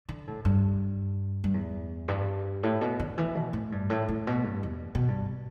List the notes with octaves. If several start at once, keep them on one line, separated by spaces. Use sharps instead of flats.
D3
A2
G2
G2
E2
G2
A2
B2
D3
E3
B2
A2
G2
A2
A2
B2
G2
E2
B2
G2